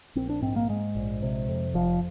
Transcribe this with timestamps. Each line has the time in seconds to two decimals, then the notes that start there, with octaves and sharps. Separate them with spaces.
0.15 A#1 C4
0.29 D4
0.42 G#2 C4
0.56 A#3
0.69 G#2 G#3
0.95 A#1
1.22 C3
1.49 F2
1.74 F1 F3